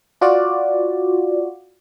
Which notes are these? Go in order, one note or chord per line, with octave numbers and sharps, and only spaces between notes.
F4 F#4 D5